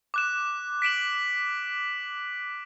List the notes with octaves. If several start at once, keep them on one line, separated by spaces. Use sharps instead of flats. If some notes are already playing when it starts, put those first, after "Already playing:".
D6 F#6 E7
B6 D7 E7 F#7